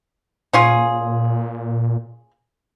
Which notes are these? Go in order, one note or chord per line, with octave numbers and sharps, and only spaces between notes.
A#2 C#4 F4 G#4